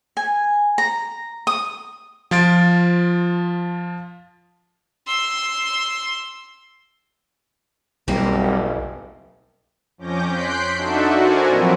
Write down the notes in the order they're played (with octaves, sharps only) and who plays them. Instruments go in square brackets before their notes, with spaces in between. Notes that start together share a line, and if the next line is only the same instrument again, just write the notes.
[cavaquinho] G#5
A#5
D#6
[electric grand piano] F3 F4 A6 D7
[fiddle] C6 E6
[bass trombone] F#1 [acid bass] B1 [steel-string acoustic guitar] G3 A#3 C4
[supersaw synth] F2 C#4 D6 G6 A#6
C6 F#6 G6 B6 C7 D7
D4 D#4 F#4 A4 E5
F#4 A#4 C5 D5 G#5
A#2 F3 F#3 C4 E4